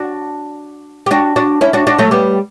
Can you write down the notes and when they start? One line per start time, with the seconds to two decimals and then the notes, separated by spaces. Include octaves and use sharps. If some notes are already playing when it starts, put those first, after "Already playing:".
Already playing: D4 F#4
1.06 G4
1.11 D4 F#4
1.36 D4 F#4
1.61 C#4 E4
1.73 D4 F#4
1.87 D4 F#4
1.98 F#3 A3
2.11 G3 B3